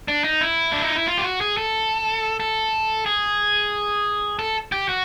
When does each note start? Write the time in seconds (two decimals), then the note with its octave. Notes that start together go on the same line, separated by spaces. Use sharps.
0.08 D4
0.24 D#4
0.41 E4
0.72 D4
0.84 D#4
0.96 E4
1.07 F4
1.18 G4
1.24 F#4
1.41 G#4
1.57 A4
2.40 A4
3.06 G#4
4.39 A4
4.72 G4
4.89 F#4